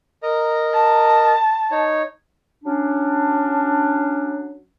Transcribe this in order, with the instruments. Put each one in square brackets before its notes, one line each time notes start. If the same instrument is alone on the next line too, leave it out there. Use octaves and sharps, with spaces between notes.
[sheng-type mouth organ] A#4 D#5 A#5
[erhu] A5
[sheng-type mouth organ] D#4 C#5
[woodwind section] F#3 C#4 D4